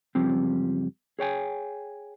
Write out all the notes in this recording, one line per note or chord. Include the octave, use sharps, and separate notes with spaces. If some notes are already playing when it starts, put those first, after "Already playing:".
C#2 F#2 F3 G3 C4
G#4 C#5 G5 G#5